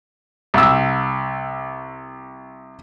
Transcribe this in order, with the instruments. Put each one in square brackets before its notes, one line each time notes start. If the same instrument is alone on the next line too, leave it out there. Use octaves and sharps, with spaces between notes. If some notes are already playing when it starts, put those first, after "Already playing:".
[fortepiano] C2 E6